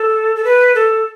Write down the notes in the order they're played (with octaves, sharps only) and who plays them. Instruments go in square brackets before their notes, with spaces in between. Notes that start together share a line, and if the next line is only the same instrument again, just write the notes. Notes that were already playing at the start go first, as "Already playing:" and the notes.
Already playing: [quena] A4
A4
B4
A4